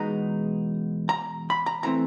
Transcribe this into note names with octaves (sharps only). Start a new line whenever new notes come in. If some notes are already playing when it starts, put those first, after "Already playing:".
Already playing: E2 B2 G#3 B3 D#4 A#5
A#5
B5
A#5
C3 E3 A3 C4 A#5